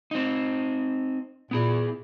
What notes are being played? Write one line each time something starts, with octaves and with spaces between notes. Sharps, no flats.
C4 D#4
A#2 B3 E4 G#4